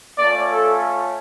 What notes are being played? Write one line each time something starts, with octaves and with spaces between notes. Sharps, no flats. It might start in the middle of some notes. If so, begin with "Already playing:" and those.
A3 C#4 F4 D5
A4